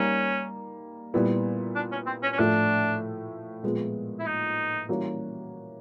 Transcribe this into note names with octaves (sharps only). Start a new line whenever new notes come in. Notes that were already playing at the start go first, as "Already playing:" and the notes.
Already playing: G3 A#3 C#4 D#4
A#2 G3 B3 E4
D4
C#4
C4
C#4
C#4
A2 F3 A3 D4
A#2 F3 G#3 B3
E4
D#4
E3 G3 A#3 C#4 F#4